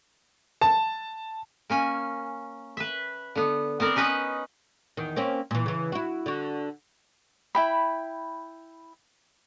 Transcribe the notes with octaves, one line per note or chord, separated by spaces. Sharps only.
A5
A#3 C#4 G#5
B4 E5
D3 B3
B3 C4 A#4 D5
C#4 D#4 B4 D#5
E2 D#3
A#3 C4 C#4
A#2 E3
C#3 E3
E4 F#4
D3 F#4
E4 G5 B5